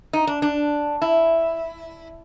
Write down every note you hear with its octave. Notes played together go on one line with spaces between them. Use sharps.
D#4
D4
D4
E4